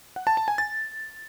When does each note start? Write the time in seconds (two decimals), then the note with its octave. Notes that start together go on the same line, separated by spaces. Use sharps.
0.16 F#5
0.27 A5
0.37 A5
0.48 G#5
0.58 A6